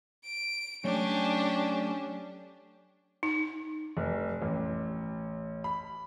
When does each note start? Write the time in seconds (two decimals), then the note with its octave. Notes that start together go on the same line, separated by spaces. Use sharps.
0.25 D7
0.84 F#3 A3 C#4 D4 G4 D5
3.23 D#4
3.97 F1
4.42 A1
5.64 B5